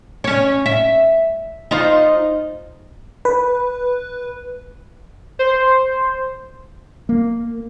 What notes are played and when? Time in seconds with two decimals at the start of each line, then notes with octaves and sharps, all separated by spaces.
0.24 C#4 C#5
0.66 E5
1.71 D#4 F4 C5
3.25 B4
5.39 C5
7.09 A#3